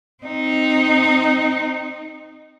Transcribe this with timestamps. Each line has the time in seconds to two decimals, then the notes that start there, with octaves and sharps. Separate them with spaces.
0.24 C4 D#4